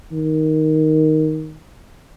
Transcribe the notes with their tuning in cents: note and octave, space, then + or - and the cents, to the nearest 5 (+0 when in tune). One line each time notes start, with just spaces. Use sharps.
D#3 +5